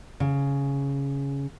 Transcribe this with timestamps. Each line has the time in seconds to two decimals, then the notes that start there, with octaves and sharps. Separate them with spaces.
0.20 C#3